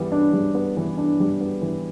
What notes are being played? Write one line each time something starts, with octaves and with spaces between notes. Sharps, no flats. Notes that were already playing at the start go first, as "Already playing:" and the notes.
Already playing: E3 G3 B3
D4
G3
B3
E3
D4
G3
B3
E3